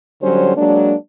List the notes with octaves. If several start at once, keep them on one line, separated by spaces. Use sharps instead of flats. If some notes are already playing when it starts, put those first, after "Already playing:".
D3 F#3 G3 C#4 C5
F#3 G#3 A#3 D4